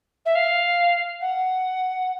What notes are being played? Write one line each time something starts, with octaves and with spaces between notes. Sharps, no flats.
E5
F5
F#5